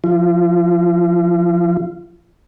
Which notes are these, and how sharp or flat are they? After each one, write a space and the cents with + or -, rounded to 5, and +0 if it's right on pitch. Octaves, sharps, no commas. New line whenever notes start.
F3 +0 F4 -35